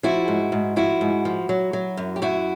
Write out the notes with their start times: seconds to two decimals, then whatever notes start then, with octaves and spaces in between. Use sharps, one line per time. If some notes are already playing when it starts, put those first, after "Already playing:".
0.03 F3 E4 F#4
0.28 G#2
0.52 G#2
0.76 F3 E4 F#4
1.01 G#2
1.25 F3
1.49 F#3
1.73 F#3
1.97 F#2
2.16 G4
2.22 F#2 E4 F#4